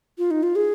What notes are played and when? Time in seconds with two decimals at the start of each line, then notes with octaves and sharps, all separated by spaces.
0.18 F4
0.31 D#4
0.43 F4
0.56 G#4